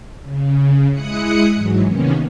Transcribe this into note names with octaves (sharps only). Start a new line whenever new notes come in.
C#3
G#3 E4 D#6 F#6 C#7
G#2 E3 F#3
C3 D#3 A#3 B3 C#4